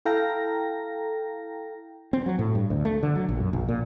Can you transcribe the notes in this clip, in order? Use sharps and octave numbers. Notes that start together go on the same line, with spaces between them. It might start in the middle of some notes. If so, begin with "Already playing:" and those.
E4 A4 F5 G5 A#5 A#6
C4
F#3
A2
G2
D2
A3
D3
F#3
A#1
F#2
A#1
A#2